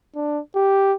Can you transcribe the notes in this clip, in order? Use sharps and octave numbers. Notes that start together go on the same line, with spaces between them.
D4
G4